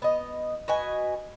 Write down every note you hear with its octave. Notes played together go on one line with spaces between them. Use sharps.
B3 D#5
F#4 B4 D#5 G#5